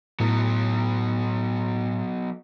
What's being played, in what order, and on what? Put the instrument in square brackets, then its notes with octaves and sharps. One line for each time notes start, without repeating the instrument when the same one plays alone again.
[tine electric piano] A2 [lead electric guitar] F#3 B3